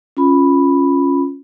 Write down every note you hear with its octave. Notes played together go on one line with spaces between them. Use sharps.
C#4 F4 B5